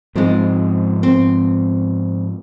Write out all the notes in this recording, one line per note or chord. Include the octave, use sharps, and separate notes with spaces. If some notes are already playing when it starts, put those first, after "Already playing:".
G#2 F3 G#3 C4
C4